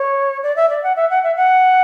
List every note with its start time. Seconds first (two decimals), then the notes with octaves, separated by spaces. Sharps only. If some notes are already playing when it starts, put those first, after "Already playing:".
Already playing: C#5
0.43 D5
0.56 E5
0.70 D5
0.83 F#5
0.96 E5
1.10 F#5
1.23 E5
1.36 F#5